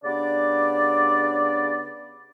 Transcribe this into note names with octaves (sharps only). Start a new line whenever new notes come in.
C#3 B3 D4 G4 D5